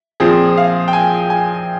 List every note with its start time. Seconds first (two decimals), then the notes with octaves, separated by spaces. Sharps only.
0.20 A#2 F3 C4 G#4
0.57 F5
0.88 G5
0.93 G#5
1.30 G#5